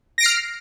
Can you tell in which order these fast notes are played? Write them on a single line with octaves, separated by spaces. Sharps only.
A#6 D7 C7 F6